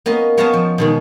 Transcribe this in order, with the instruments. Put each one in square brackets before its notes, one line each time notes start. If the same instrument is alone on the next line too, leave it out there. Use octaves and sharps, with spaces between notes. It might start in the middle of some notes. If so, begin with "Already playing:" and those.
[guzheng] A#3 B3 C#4 D#5
B3 C#5 D#5 F5 G#5 A5
F3
B2 D#3 G#3